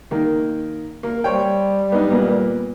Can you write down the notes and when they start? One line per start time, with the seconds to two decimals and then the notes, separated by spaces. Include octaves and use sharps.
0.11 D#3 A#3
1.03 A#3
1.24 G3 C5 C#5 G5
1.92 B3 D4 D#4
2.11 A#2 A#3 B3